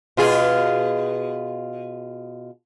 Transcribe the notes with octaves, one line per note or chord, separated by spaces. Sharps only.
B2 F4 G#4